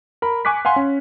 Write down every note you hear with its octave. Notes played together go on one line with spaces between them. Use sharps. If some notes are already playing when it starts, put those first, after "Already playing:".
A#4 B5
G#5 C#6 D6 F#6 B6
F5 F#5 G#5 C6
C#4